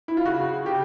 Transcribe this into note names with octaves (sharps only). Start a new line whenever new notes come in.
E4
F4
C#3 F#4
C#3 G4